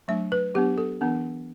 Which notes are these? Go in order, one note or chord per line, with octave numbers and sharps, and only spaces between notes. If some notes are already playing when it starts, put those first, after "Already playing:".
F#3 A3 D4 E5
B4
F#3 B3 D4 G4
A4
E3 B3 D4